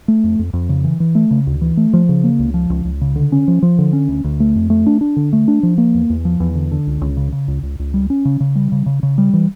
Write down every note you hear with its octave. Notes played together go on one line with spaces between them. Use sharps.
A3
F2
F2
F2
C#3
E3
E3
A3
C#3
D2
E3
A3
F3
C#3
A#3
C#2
F3
C#2
C#2
C#3
D3
C#4
F3
F3
D3
C#4
D2
D2
A3
F2
A3
D4
D4
D3
A3
D4
F3
A#3
E2
E2
F3
E2
D3
D3
C#2
C#2
C#3
C#3
C#2
C#2
C#2
G3
C#4
C#3
C#3
G3
C#3
C#3
C#3
G3
E3